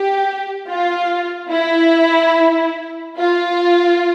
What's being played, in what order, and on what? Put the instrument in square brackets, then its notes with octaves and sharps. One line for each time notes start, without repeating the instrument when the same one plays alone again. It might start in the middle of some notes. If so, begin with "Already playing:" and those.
Already playing: [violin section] G4
F4
E4
F4